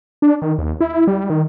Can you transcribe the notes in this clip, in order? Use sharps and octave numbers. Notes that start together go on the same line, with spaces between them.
D4
D#3
D#2
E4
G3
D#3